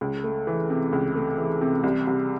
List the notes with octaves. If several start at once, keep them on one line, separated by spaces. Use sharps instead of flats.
C#2
A3
E3
C3
C#2
A3
E3
C3
C2
C2